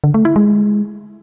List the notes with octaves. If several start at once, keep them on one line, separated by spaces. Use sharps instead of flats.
D3
A3
E4
G#3